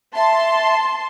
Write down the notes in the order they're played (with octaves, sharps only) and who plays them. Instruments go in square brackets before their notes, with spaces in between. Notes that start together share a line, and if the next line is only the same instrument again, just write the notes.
[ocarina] E5 [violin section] A5 C6